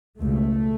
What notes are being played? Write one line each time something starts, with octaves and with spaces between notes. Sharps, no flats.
C#2 B2 A3